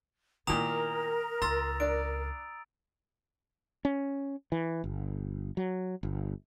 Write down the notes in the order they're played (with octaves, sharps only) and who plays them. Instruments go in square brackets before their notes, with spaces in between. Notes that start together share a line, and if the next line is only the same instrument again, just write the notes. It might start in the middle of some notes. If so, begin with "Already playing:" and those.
[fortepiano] A#2 D#3 [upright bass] B3 E4 [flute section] A#4 [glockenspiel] A#5 D#6 F7
[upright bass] C#2 [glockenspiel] A#5 E6 A6 [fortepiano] C6
[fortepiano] D4 D5 [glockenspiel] D7
[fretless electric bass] C#4
E3
G1
F#3
G1